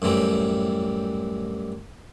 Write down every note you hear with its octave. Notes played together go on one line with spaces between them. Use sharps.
F#2 A2 E3 G3 C4